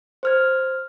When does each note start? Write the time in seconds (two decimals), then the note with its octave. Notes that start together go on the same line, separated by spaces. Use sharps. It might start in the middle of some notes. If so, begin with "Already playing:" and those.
0.23 C5 F6 G#6